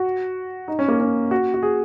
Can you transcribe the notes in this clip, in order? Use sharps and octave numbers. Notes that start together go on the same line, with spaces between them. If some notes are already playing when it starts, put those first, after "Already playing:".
Already playing: F#4
D#4
C#4
A#3
C#4
F#4
F#4
G#4